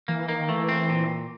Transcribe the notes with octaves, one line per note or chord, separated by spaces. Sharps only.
E3 A#3
D#3 A#3
E3 A3
C4
A#2